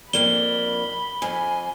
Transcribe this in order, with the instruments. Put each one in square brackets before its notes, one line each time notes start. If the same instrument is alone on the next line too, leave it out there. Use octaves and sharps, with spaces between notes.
[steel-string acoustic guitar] F2 A#3 D4 [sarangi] B5 [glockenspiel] G7
[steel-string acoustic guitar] F2 [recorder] G#5